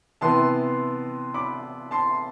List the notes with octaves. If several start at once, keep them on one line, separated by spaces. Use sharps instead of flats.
C3 E3 B3 A5 C6
B5 D6
A5 C6